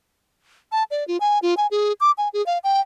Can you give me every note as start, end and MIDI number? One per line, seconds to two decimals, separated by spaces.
0.72 0.84 81
0.91 1.06 74
1.08 1.18 65
1.20 1.39 80
1.42 1.55 65
1.57 1.67 80
1.71 1.93 68
2.01 2.11 86
2.18 2.29 80
2.33 2.44 68
2.46 2.58 77
2.64 2.81 79